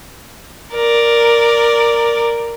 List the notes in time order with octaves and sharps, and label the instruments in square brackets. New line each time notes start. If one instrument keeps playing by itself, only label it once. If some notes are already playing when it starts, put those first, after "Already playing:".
[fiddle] A#4 D5